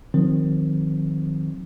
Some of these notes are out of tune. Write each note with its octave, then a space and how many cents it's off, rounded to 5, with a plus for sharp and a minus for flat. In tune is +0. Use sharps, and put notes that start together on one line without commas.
D#3 +0 F#3 -45 C4 +0